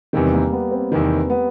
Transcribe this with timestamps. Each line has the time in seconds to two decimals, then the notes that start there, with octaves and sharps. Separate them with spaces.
0.13 E2 C3 D#3 G3
0.34 A#3
0.53 B3
0.71 C4
0.91 E2 C3 D#3 B3
1.30 B3